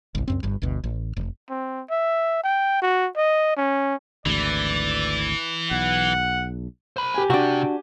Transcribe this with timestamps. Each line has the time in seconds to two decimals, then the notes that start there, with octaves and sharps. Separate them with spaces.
0.15 G1 C2
0.28 C#2 F#2 C4
0.43 G1 G2
0.62 G1 D2 B2
0.84 A1
1.17 F1
1.50 C4
1.90 E5
2.44 G5
2.82 F#4
3.17 D#5
3.57 C#4
4.26 G#1 D2 E3 D5
5.71 B1 F#5
6.97 C5 B5
7.14 G4 G#5
7.30 C3 D4 F#4 G5